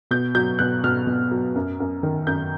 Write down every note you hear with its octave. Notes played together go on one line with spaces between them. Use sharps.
B2 G6
F#3 G6
B2 F#6
B2 F6
B2
F#3
F#2
F#2
D#3
F#2 G6